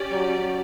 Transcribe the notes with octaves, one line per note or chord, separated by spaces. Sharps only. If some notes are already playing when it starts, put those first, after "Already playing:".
Already playing: C#4 G4 D5
F#3